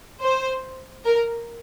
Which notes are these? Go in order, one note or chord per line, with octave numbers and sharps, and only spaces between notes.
C5
A#4